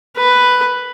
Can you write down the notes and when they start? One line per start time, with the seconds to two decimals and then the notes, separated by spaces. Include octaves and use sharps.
0.17 B4